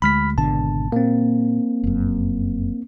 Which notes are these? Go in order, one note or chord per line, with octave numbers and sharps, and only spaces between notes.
D2 G#3 B5 F6 B6
G#1 B2 D3 A5
A#2 A#3 C4
F1 F#2